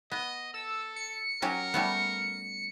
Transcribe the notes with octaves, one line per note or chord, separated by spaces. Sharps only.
B3 D#5
A4 E6
C#7
F#3 C#4 G4 A#4
G3 A3 B3